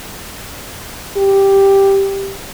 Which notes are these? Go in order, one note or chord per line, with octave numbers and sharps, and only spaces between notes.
G4